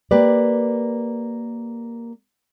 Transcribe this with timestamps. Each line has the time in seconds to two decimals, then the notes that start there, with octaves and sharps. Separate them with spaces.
0.11 A#3 G4 B4 D5